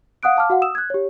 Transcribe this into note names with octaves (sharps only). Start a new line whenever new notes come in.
F5 F#5 D#6 F#6 D7
F5 A5 D6 F6
F#4 F5 F#5
D#6 E6 E7
F#6 G#6
G4 C#5